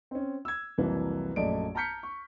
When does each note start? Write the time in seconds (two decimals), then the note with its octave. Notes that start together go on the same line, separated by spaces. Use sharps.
0.11 C4 C#4
0.45 E6 G#6
0.78 C2 F2 C3 E3 F#3 A#3
1.36 A#1 F#2 A3 D5 D#5 D7
1.75 A5 A#5 F6 G6 B6 C#7
2.03 C#6